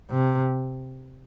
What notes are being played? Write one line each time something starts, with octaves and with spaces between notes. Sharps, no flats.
C3